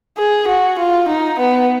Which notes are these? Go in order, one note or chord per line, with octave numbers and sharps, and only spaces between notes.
G#4
F#4
F4
D#4
B3